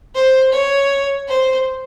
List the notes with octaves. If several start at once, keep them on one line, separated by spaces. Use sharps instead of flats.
C5
C#5
C5